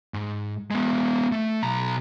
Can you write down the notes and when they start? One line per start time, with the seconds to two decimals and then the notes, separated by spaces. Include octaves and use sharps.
0.14 G#2
0.71 G#3 B3
1.32 A3
1.63 B1 A#5